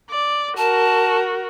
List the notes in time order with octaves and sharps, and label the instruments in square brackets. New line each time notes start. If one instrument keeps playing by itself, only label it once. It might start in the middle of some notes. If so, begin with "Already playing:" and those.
[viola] D5
[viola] F#4 A#4 [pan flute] A5